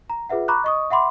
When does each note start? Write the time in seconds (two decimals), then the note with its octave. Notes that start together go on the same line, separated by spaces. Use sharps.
0.10 A#5
0.29 F4 G#4 B4 E5 F#5
0.48 A#5 B5 C#6 D6 F#6
0.64 D#5 C#6 D#6
0.90 E5 F#5 B5 C6 D6